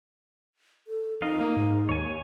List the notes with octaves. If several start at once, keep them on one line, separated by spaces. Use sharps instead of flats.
A4
F2 D#4 A#4 D#5 F5
A#3
G#2
D#2 C#5 G#5